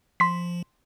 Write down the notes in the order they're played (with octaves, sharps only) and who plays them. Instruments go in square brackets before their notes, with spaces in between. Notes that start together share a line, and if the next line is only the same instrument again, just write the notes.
[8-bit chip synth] F3 [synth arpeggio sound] C6 B6